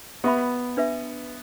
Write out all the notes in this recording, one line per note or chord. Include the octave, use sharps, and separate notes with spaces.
B3 G4 E5 B5
D4 B4 E5